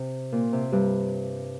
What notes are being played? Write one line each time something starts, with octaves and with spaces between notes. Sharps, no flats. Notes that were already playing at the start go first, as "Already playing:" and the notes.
Already playing: C3
A#2
C3
G2 G3